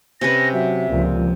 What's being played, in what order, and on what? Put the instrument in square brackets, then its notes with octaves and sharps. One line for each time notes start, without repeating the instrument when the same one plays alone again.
[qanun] C3 C#4 B4 [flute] A#6
[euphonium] F#3 [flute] E5
[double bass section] C#2 F3 [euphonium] A#2